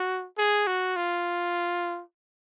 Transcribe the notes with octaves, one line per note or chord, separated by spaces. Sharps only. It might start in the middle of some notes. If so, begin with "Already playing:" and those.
Already playing: F#4
G#4
F#4
F4